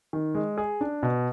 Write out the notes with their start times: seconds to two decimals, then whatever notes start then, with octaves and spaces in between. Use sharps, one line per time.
0.13 D#3
0.35 G#3
0.58 G#4
0.81 D4
1.03 B2